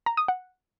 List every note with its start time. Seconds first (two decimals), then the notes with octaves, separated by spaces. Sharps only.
0.06 A#5
0.17 D#6
0.28 F#5